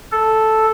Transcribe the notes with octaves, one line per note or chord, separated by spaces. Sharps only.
A4